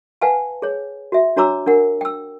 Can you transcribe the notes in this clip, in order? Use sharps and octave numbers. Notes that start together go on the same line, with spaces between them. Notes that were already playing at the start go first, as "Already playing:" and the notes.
B4 F5 F#5 G#5 A5
G#4 C#5
F#4 E5
D4 F#4 C#5 A#5 D6 E6
D4 A#4 F#5
G5 E6